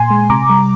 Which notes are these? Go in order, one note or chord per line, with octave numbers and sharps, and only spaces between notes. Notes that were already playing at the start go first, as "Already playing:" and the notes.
Already playing: A#2 G#5 C6
G#3
C3 A#5 D6
G3